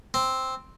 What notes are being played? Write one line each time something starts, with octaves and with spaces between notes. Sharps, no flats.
C4